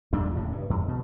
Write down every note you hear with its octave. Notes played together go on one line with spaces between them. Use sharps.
E2 A#2 G3 D4
D#1 A2 C#3
G2
F2
B2